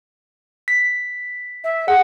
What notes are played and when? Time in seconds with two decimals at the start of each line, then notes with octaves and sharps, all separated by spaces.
0.68 B6
1.63 E5
1.88 G#4 F#5